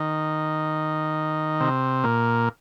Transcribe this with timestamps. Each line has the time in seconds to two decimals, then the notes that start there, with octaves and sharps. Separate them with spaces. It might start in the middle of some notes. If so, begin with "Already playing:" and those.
Already playing: D#3
1.60 C3
2.04 A#2